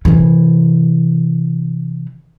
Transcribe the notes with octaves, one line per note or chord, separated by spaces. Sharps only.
C3 E3